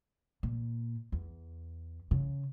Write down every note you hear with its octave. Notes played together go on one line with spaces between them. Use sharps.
A#2
E2
C#3